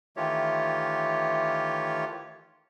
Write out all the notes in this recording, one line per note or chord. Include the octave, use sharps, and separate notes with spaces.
D#3 E3 A3 F4 G4 C#5